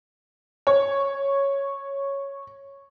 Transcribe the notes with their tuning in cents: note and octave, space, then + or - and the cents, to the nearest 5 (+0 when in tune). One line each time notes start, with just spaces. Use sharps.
C#5 -5